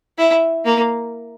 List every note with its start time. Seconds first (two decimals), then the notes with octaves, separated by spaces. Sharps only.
0.18 E4
0.65 A#3